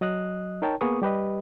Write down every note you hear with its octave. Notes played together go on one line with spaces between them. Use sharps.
F#3 D#5 D#6 F#6
D#4 A#4 C#5 G5 A5
A#3 B3 G#4 B4 C#6 D#6
G3 G4 B4 D#5